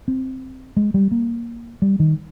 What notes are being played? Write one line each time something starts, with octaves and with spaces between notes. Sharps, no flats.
C4
G#3
G3
A#3
G3
D#3